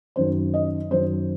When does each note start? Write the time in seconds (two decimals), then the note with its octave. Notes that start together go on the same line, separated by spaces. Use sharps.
0.16 F#2 D#3 F#3 C5
0.54 D#5
0.90 F#2 D#3 F#3 C5